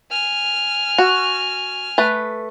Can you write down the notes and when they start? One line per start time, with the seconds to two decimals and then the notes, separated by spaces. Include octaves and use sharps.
0.11 G#5 F6
0.98 F#4
1.98 A3 B4